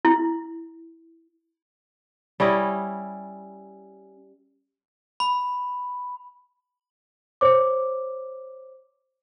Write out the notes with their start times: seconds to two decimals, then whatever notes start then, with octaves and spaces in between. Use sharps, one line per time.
0.05 E4
2.40 G3 C#4 E4 D#5
5.20 B5
7.41 C5 C#5 D6